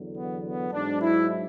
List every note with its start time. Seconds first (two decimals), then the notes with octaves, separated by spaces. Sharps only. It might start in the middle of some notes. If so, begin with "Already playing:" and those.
Already playing: E2 D3 F#3
0.16 B3
0.44 B3
0.72 G#2 F#3 D4
1.00 E4